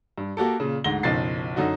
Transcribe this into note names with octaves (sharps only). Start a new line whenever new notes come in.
G2
A#3 F#4 G4 A4
A#2 C#3
D2 G#2 A#6 G7
F#1 B1 F3 A6 C7
F#2 D3 D#4 F#4